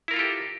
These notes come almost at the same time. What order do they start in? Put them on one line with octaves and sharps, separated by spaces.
E4 A#4 F4 A4 G4